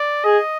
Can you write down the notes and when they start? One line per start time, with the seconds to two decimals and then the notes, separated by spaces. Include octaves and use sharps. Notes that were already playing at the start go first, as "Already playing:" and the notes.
Already playing: D5
0.25 G#4 D#5